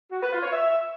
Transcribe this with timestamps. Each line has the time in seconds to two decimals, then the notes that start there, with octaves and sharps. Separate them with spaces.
0.10 F#4
0.20 B4
0.31 F4
0.41 C#5
0.52 E5